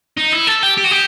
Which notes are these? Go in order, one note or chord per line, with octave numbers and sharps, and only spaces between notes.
D#4
E4
A4
G4
G4
F#4
G4